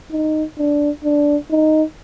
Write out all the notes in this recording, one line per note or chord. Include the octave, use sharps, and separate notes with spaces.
D#4
D4
D4
D#4